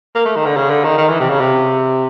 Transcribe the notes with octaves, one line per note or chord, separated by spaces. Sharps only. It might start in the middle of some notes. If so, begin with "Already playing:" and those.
A#3
A3
D#3
D3
C#3
D3
D#3
D#3
E3
C3
C#3
C3